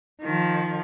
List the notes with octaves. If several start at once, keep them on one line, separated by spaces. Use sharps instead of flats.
D#3 F3